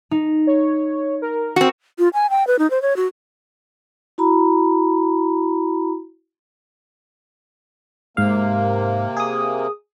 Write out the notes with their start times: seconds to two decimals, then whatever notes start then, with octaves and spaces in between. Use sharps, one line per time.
0.11 D#4
0.47 C#5
1.22 A#4
1.56 C4 F#4
1.99 F4
2.14 G#5
2.30 G5
2.47 B4
2.59 D#4
2.70 C5
2.82 C#5
2.96 F#4
4.18 E4 F#4 A#5 B5
8.17 G#2 C3 A#3 F5
9.17 G#4 D#6